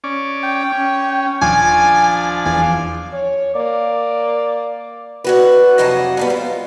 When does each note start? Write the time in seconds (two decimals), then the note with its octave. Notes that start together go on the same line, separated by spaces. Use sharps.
0.04 C#4 D5
0.43 G5
0.72 C#4
1.42 D#1 F3 D4 G#5
2.45 E2 G#5
3.13 C#5
3.55 A#3 D5
5.24 D3 F#4 B4
5.78 F2 C3 F#3 D#5 F#5 A5
6.17 G2 G3 B3
6.30 F4